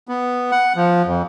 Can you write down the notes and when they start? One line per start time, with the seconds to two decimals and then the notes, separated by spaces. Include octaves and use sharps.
0.09 B3
0.51 F#5
0.76 F3
1.06 F2